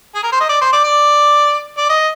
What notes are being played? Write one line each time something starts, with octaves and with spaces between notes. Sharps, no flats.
G#4
A#4
C5
D#5
D5
C5
D5
D5
D5
D#5